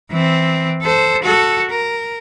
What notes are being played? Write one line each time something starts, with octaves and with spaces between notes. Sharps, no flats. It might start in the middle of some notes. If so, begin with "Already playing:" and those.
E3 C4
A4 C5
F#4 A4
A#4